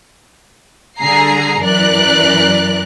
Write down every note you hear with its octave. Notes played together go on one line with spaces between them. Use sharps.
D3 G3 G#4 A#5 C7
F#2 E3 A#4 D5 F#6